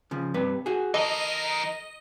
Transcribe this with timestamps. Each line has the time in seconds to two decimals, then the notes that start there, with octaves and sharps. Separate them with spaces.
0.11 C#3 F3
0.34 G2 C3 B4
0.66 F#4 G#4
0.94 E3 A4 A#4 D#5